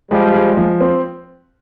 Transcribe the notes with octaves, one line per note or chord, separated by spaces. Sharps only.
F3 G3 G#3
G#3
F3
C4